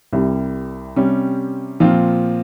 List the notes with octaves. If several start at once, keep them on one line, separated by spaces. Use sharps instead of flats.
C2 C3 G3
C3 G3 C#4
A#2 F3 C4 F4